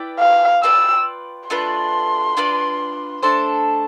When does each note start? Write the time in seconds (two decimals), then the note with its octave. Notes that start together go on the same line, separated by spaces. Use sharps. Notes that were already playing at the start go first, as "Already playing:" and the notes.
Already playing: E4 B4 D5 G5
0.19 F5
0.63 F4 B4 D5 G5 E6
1.50 A3 D4 F4 B4 C6
2.37 D4 F4 B4 D5
3.23 A3 D4 A4 C5